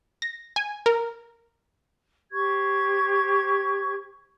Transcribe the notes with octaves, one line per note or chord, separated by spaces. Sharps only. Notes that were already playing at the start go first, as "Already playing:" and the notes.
A#6
G#5
A#4
G4 C5 C#6 G#6